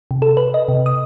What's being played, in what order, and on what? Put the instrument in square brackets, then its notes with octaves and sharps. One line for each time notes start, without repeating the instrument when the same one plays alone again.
[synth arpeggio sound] C3
A4
B4
D#5
C3
D#6